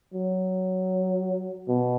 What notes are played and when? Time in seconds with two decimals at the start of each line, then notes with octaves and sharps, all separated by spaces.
0.14 F#3
1.68 B2